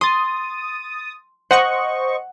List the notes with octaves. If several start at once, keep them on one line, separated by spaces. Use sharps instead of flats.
C6 D#6 A6
C5 D#5 F#5 C#6